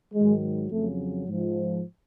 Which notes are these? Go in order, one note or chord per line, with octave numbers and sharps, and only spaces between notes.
G#2 D#3 F#3 G#3
F2 C#3 F#3 A3
G#2 F3